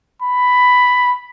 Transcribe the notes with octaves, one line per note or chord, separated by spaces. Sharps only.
B5